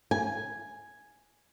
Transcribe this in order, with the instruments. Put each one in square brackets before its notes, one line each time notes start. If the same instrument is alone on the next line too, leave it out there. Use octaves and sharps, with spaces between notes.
[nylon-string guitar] G#5